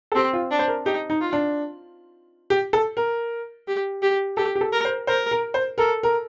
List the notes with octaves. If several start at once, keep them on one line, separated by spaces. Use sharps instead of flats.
A4
C4 G4
F4
D4
C5
A#4
D#4 G4
D#4
F4
D4
G4
A4
A#4
G4
G4
G4 A4
G4
A4
A#4
C5
A#4 C5
A#4
C5
A4 A#4
A#4